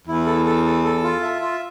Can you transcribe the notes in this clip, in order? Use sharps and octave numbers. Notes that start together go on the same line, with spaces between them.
E2 E4
A4
A4
A4
A4
F4
E5
F4